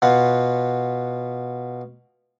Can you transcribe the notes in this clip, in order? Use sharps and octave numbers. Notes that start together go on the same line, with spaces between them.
B2 B3 F4 F#5